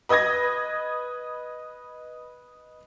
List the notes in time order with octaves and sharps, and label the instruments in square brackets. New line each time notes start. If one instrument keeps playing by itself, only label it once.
[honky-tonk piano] B4 D#5 D#6 G#6 A#6